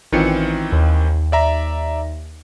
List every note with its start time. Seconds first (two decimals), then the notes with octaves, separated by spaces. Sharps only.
0.12 A1 D#3 E3 C4 F4 C#7
0.72 D#2
1.32 D5 E5 A#5